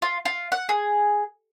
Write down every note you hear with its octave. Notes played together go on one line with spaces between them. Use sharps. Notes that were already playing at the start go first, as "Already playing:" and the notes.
F4
F4
F#5
G#4